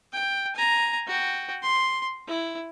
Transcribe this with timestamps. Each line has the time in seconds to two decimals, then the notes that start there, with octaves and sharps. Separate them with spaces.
0.13 G5
0.56 G#5 A#5
1.07 F#4 G5
1.63 C6
2.27 E4